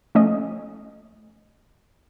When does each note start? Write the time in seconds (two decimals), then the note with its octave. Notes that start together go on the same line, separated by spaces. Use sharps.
0.15 F3 A3 C#4 D#5